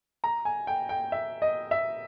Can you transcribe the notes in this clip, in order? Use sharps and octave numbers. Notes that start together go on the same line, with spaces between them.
A#5
G#5
G5
G5
E5
D#5
E5